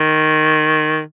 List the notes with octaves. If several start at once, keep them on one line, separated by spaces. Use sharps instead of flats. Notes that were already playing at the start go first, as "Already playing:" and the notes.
Already playing: D#3